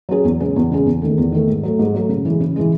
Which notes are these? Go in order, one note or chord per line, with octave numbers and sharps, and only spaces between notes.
F#3 C#4 G#4
E2
C#3 G#3 C#4 G#4
E2
C#3 G#3 C#4 G#4
E2
D#3 A3
E2
D#3 A3
G#2
F#3 A3
G#2
F#3 A3
C#3
E3 G#3
C#3
E3 G#3